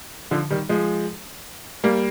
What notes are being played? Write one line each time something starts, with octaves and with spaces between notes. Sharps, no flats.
D3 F3
D#3 G3
F3 G#3
G3 A#3